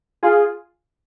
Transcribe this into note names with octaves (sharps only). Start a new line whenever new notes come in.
F4 G#4